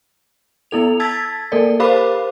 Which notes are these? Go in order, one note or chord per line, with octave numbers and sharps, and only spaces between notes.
B3 E4 A4 F7
A5 E6 G#6 A6 B6
A#3 A4 A#4 D5
G4 A#4 C5 F5 B5 D6